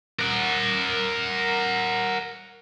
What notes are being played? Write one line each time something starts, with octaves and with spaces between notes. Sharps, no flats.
A#4 F#5